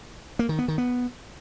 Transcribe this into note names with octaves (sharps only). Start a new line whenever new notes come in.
A#3
D#3
B3
D#3
B3